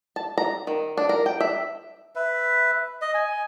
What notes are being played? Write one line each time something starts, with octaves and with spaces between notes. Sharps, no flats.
A5
A#5
D#3
D4
A#4
G5
E5
B4 E5
D#5
G#5